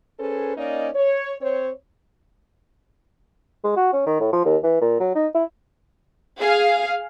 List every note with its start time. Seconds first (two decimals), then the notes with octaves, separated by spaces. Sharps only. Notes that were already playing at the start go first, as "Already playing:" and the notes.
0.19 C#4 G#4 A4 B4 C5
0.56 A#3 C#4 D#4 D5 D#5
0.95 C#5
1.40 C4 C5 C#5
3.64 G#3
3.76 F#4
3.93 C#4
4.06 D#3
4.20 A2
4.33 F3
4.45 D#2
4.64 E3
4.81 A#2
5.00 F#3
5.15 D#4
5.34 E4
6.40 G#4 F5